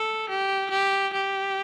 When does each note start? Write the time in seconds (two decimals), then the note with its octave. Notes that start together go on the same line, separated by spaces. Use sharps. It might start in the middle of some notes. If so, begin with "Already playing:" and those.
Already playing: A4
0.29 G4
0.71 G4
1.14 G4